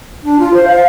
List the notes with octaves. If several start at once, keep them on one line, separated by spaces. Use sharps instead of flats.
D4
F4
C5
F5